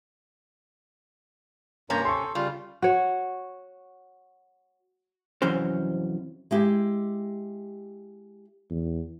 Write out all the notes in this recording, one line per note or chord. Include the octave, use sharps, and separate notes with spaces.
G2 C3 A#3 C#4 A#5
A4 C6 C#6
C#3 G3 F4
F#4 C#5
C2 F2 E3 F#3 C#4 C5
G#3 E4 G4
E2